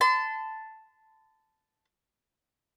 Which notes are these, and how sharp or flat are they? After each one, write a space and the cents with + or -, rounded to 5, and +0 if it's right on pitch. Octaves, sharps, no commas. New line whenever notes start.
A5 +0 C6 -40